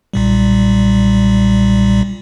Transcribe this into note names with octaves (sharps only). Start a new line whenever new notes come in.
B1 A#2 G3